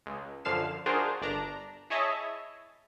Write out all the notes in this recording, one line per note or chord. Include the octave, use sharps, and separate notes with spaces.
C#2
F#2 D3 F3 F5 C7 E7
D4 F4 F#4 G#4 A#4 C5
G1 D4 A#5
E4 G#4 C#5 D#5 E5 A5